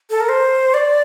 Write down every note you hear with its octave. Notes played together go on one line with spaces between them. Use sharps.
A4
A#4
C5
D5